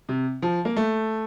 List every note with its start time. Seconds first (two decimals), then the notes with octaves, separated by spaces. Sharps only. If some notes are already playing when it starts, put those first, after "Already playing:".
0.09 C3
0.42 F3
0.65 A#3
0.76 A3